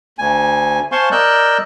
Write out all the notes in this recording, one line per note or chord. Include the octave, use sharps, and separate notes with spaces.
D2 G#5
C5 F5 G#5 A5 C6 C#6
A#4 D5 D#5 E6 F#6 G6